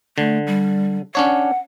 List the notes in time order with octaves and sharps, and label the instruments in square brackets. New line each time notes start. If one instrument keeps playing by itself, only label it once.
[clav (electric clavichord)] D3 [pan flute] A3
[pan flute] G3
[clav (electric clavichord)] C#4 D4 C#5 [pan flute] F#5